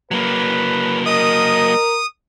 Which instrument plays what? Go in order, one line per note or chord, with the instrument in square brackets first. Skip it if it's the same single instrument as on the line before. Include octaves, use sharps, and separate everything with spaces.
[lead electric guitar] F#3 A#3 [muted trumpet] B4
[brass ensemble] A#4 [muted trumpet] D#5 [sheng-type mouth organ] D#6